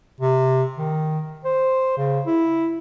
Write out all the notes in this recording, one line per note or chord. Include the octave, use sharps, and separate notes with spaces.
C3
D#3
C5
C#3
E4